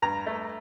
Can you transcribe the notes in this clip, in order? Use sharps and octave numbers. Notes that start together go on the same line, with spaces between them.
G2 A#5
A3